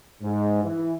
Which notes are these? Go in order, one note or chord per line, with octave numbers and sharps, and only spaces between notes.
G#2
E3